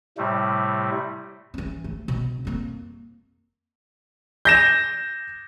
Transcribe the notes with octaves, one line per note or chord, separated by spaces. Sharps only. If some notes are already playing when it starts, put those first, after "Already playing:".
A2 C3 G3 A3
E3 C#4
A3
B2
F2 A#3
G6 A#6 E7